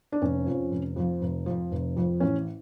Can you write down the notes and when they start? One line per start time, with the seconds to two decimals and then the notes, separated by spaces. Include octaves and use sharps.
0.12 D4
0.21 F1 C#4
0.46 F2 F3
0.71 F1
0.96 F2 F3
1.21 F1
1.46 F2 F3
1.71 F1
1.96 F2 F3
2.20 A1 C#4